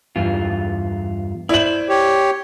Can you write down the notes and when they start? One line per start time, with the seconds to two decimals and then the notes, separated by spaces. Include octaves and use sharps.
0.16 E2 G2 F4
1.49 E4 C5 D5 F#7
1.89 G4 C#5